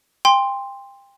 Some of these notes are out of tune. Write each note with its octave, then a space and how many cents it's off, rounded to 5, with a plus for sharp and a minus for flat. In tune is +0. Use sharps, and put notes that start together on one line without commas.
G5 +30 C6 +0